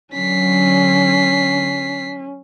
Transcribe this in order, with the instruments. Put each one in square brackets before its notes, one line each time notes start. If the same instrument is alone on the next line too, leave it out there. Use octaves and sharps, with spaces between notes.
[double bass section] D3 F#3 [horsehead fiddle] C#4 [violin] B6 C7